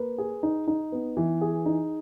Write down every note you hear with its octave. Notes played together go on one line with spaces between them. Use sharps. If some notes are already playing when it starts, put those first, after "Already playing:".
Already playing: A#3 B4
G#4
D#4
D#4
B3
E3
G#4
D#4